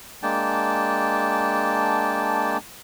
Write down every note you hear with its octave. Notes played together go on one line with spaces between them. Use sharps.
G#3 A#3 D4 G5 A5